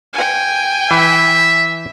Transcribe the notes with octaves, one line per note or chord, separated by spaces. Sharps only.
G5 G#5
E3 E5